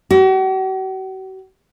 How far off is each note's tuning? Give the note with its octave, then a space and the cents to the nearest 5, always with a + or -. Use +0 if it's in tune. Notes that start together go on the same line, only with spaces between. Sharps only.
F#4 +45